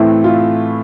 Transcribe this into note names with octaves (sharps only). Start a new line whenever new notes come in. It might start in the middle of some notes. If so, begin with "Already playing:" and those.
Already playing: A2 E3 A3 C4 E4
F4